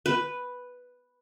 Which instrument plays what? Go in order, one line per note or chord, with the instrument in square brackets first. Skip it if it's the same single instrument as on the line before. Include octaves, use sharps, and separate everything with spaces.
[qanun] B4